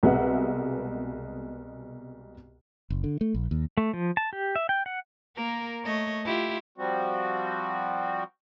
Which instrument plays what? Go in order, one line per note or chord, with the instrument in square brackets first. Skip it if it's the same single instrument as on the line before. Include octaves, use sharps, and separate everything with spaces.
[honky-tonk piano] C2 B2 G#3 B4 E5 F#5
[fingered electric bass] F#1
D3
A3
A#1
D#2
[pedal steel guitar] A3
F3
A5
G4
E5
G5
F#5
[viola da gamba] A#3 A#4
A3 C#5 D#5
E4 F4 G4
[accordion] F3 G3 C4 F#4